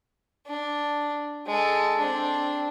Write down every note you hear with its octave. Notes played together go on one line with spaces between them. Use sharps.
D4
G#3 A4
C4 D4